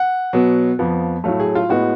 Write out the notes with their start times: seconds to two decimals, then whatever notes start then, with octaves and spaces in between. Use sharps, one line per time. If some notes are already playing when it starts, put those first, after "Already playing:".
Already playing: F#5
0.33 B2 F#3 B3
0.79 F2 F3 B3
1.24 A2 F#3 A3 F5
1.40 G#4
1.55 F4
1.69 A2 G#3 B3 F#4